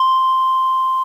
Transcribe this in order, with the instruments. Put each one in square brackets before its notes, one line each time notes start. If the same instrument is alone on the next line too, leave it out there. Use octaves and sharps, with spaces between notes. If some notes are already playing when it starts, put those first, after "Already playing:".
Already playing: [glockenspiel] C6